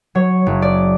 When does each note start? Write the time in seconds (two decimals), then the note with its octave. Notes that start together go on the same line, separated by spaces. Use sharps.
0.15 F#3 C#5
0.46 F#1
0.62 D5